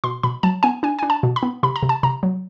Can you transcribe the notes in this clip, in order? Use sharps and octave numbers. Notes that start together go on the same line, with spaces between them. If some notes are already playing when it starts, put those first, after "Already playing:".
B2 C6
B2 B5
F#3 A5
B3 G#5
D4 G#5
D4 G#5
A5
B2
B5
B3
C3 B5
A#5
C3
A5
C3 A#5
F#3